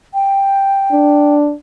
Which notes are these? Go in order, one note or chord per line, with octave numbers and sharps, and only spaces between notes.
G5
D4